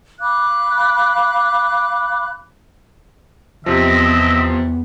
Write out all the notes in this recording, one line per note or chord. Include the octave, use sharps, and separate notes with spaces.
F5 B5 D6 F#6
E2 C3 F3 B3 C4 D#5 E5